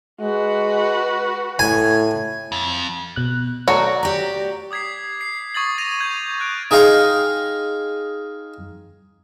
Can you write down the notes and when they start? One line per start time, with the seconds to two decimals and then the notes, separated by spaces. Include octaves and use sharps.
0.21 G#3 F#4 B4
1.59 A2 G#5
2.52 F2
3.16 B2 F#6
3.68 F#3 A3 F#4 C#5 D5 A#5
4.03 G4 D5 A#5
4.71 D6 D#6 G#6 B6 C7
5.21 C7
5.54 C#6 D#6 G#6 A6 F#7
5.77 D#6 G#6 A#6 D#7 F7
6.01 G6 G#6 F#7
6.39 D#6 F6 F#6 D7 F7
6.71 D#4 G#4 D#5 F5 G5 C6